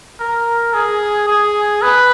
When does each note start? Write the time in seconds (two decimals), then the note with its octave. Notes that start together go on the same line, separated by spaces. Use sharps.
0.20 A#4
0.74 G#4
1.28 G#4
1.82 B4